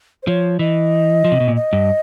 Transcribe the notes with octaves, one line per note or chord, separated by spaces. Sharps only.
C5
F3 C#5
E3 D#5
F3
C3
B2
A#2
D#5
G2